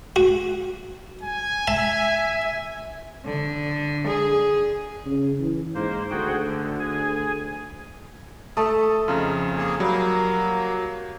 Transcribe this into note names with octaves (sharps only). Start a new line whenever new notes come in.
F#4
G#5
E5 A5
D3
G#4
C#3
E3
G#2 A#3 C5
D2 F#4 G#4 G5
D3
G#4 G#5
A3 A4 A5 D#6
F2 C#3 D#4 F4
A#3 G#4
F#3 G3 A#3